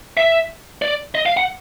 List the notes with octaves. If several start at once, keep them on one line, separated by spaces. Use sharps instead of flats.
E5
D5
D#5
F5
F#5